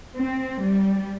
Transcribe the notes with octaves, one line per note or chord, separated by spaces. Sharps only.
C4
G3